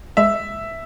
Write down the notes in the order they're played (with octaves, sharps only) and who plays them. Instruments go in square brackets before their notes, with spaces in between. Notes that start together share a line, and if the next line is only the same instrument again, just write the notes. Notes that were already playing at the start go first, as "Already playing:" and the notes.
[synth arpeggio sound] G#3 [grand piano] E5